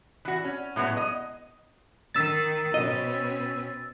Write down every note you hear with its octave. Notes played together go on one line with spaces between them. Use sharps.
E3 F#4
C#4
A2 F#3 G#3 B3
D#5
D#3 E6 A6
B2 C4 C#4 D#5